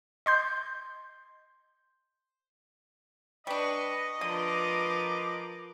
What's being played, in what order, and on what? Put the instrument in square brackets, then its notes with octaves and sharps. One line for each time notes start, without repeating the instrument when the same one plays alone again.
[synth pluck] D#5 C6 G6
[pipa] G3 D4 [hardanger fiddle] B4 C#6 [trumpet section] D#5
[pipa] D3 [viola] F3 D6 [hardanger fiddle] A#4 B4